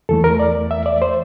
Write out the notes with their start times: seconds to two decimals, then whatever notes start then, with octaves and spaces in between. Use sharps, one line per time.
0.09 E2 E3 A3 A4
0.24 A#4
0.39 D5
0.71 E5
0.86 D5
1.02 C5